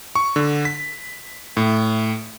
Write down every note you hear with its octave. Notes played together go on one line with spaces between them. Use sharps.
C#6
D3
B6
A2